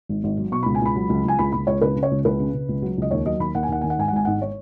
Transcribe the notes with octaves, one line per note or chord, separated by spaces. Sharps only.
G#1
G#1
F#3
B2 C#6
C#2 B5
G#5
C#2 B5
F#3
C#2
C#2 G#5
C#2 B5
C#2 B5
C#2 C#5
C#3 B4
C#3
C#5
C#2
C#2 B4
C#3
C#3
C#2
F#3
C#2 D#5
D#2 C#5
F#3 D#5
D#2 B5
D#2 F#5
G#5
D#2 F#5
D#3 G#5
F#5
G#2 G#5
F#5
G#1 G#5
G#2 F#5
C#5